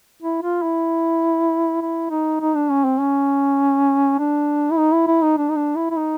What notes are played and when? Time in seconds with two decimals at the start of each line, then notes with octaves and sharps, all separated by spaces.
0.22 E4
0.42 F4
0.62 E4
1.81 E4
2.10 D#4
2.41 D#4
2.56 D4
2.70 C#4
2.85 C4
3.00 C#4
4.19 D4
4.71 E4
4.77 D#4
4.92 E4
5.07 E4
5.22 D#4
5.37 D4
5.50 D#4
5.56 D4
5.76 E4
5.91 E4
5.97 D#4